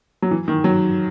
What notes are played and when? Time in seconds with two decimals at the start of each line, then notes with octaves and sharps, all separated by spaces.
0.22 F#3
0.31 E3
0.48 D#3
0.64 F#3